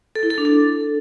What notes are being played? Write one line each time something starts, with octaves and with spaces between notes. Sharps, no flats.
A4
E4
A4
D4
A4